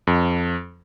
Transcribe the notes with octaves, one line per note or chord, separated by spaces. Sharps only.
F2